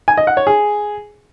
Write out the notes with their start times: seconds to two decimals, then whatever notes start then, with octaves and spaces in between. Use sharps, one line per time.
0.08 G#5
0.17 D#5
0.27 F#5
0.37 C#5
0.47 G#4